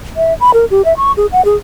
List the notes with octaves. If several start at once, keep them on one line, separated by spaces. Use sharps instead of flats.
E5
B5
A#4
G4
E5
C#6
G#4
F#5
G#4